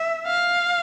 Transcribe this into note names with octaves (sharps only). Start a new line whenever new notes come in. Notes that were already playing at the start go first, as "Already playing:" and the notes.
Already playing: E5
F5